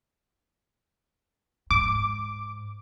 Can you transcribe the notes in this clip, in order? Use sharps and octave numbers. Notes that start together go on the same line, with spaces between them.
G#2 D6